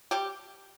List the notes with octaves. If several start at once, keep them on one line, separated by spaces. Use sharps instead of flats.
G3 G4